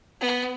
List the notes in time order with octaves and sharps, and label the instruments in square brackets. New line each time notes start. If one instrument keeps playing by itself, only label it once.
[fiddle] B3